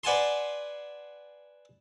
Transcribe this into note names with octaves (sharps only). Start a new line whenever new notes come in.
B4 D5 F#5 G#5 A5 C6